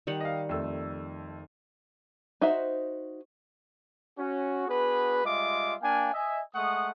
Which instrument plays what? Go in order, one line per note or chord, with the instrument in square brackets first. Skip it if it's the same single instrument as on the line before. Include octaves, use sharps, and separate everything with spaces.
[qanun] D#3 G3 F#5
[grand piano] D#5 F5
F2 A3 E6
[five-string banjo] D#4 F#4 C5 E5
[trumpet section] C#4 F#4
B3 D4 F#4 G#4 B4
G3 G#3 F4 D#5 E5 D6
A#3 D4 F5 G5 G#5
D#5 E5 G#5
G#3 A3 F#5 C#6 D#6